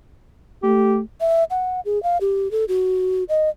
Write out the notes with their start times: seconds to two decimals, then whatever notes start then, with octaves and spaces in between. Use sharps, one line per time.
0.63 A3 G4
1.21 E5
1.50 F#5
1.85 G#4
2.03 F5
2.21 G4
2.51 A4
2.68 F#4
3.29 D#5